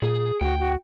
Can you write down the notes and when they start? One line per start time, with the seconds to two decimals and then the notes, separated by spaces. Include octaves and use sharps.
0.02 A#2 G#4
0.41 D2 F#4 G5
0.60 F#4